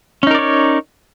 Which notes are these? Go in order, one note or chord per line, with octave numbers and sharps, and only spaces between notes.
C#4 D#4 A#4 C#5 D5